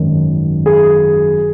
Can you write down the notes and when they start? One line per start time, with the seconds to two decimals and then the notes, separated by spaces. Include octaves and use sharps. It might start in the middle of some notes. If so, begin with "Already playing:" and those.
Already playing: G#1 F#2 D#3 F#3
0.66 G#4